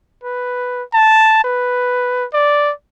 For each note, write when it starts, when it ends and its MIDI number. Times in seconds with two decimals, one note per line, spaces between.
0.24 0.83 71
0.94 1.42 81
1.44 2.25 71
2.34 2.72 74